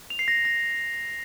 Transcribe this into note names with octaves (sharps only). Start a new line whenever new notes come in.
F7
C7
A#6
C7
A#6